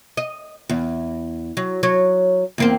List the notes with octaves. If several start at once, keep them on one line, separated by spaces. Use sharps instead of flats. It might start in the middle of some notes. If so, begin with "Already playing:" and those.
D#5
E2
F#3
F#3 C#5
E2 A#3 C4